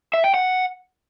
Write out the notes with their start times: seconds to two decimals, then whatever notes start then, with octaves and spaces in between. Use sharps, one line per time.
0.14 E5
0.24 G5
0.34 F#5